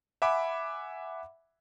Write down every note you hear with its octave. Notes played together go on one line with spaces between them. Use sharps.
E5 F#5 G#5 B5 D6